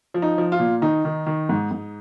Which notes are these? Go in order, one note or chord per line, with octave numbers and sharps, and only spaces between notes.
F3
D#4
F3
F4
A#2
D#3 D#4
D#3
D#3
G#2
G#2